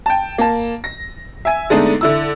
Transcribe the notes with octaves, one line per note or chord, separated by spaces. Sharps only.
G5 A5
A#3 A5
A#6
E5 G#5
D3 G#3 A3 B3 D4 D#4
D3 E4 E6